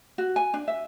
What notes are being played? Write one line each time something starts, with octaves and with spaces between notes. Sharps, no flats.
F#4
G#5
D4
E5